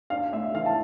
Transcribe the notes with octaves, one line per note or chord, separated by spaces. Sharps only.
D4 F5
A3 E5
E3 F5
A5